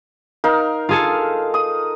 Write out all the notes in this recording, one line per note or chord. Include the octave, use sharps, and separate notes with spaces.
D#4 A#4 F5
F4 G#4 A4
D#6